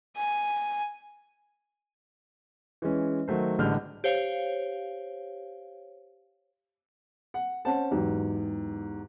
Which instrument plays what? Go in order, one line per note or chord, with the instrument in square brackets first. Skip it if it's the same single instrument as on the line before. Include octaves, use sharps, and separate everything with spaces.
[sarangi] G#5
[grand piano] E3 G#3 C#4
D#3 F#3 A3 C5
A1 D3 G3 G#3 F6 G6
[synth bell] G4 C5 C#5 F5
[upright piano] F#5
C#4 C5 F#5 A5
E2 G#2 F#3 G4